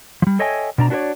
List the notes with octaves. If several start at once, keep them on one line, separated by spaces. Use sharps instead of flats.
F3 G3
A4 C#5 D#5 E5 G5 G#5
B2 D4 A#5
D4 F#4 G4 A#4 C#5 D5